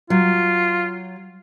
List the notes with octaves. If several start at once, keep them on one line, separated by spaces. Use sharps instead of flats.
F#3 F4